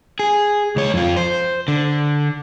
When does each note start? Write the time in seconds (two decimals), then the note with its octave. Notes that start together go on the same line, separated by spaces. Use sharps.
0.19 G#4
0.76 C#2 C#5
0.94 F2 F4
1.17 C5
1.68 D3